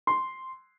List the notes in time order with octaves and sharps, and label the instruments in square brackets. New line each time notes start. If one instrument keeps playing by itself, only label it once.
[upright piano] C6